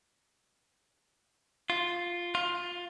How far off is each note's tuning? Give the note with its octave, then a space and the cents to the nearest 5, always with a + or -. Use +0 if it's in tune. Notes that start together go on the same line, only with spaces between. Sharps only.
F4 +0
F4 +15